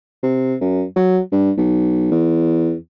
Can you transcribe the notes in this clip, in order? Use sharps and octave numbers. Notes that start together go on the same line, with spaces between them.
C3
F#2
F#3
G2
B1
E2